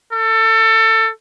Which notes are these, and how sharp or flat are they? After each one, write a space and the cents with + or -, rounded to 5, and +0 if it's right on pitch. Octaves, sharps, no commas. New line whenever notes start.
A4 +25